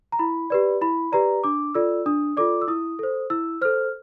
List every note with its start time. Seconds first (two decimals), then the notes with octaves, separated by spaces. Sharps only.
0.12 A#5
0.19 E4 B5
0.50 G4 B4 D5
0.81 E4 B5
1.12 G4 B4 D5 A#5
1.44 D4 D6
1.74 F4 A4 D5 E6
2.06 D4 D#6
2.37 F4 A4 D5 D6
2.62 E6
2.68 E4 D#6
2.99 A4 C5
3.30 E4 E6
3.61 A4 C5 F6